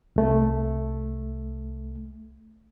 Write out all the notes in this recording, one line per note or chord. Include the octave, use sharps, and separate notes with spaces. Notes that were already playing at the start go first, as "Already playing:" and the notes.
C2 A3